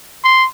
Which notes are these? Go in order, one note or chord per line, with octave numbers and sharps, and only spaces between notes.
C6